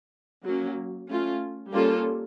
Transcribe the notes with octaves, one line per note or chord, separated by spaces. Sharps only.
F#3 A#3 C#4
A3 C#4 F4
G3 A#3 C#4 F4 A4